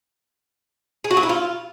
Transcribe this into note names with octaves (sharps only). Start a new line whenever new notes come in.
G#4
F#4
F#3
E4
F4